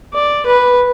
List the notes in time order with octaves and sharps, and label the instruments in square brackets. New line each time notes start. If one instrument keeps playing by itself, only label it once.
[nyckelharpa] D5
B4